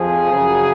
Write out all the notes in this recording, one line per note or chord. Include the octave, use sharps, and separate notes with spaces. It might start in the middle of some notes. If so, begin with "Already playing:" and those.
Already playing: F2 F3 G#4
F#2 C#3 F#3